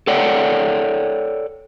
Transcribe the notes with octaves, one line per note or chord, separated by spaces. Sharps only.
A4 C#5 D5 F#5 G5